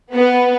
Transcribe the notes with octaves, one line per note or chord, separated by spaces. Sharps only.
B3